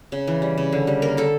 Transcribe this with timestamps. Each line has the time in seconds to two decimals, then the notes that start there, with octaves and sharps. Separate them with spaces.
0.12 C#3
0.27 E3
0.42 G3
0.58 C#3
0.72 D3
0.87 G3
1.02 A#3 A#4
1.17 D3 A4